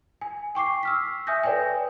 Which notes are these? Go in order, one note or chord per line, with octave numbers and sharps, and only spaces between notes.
G#5
G5 C#6 D6 C7
E6 F6 B6
E5 G#5 D#6 G6 A#6
A4 B4 C#5 D5 G5 G#5